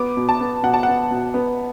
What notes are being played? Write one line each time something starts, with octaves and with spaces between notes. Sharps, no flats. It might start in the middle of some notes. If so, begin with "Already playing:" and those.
Already playing: B3 D6
B2
A5
B3
B2 F#5
A5
B3 F#5
B2
B3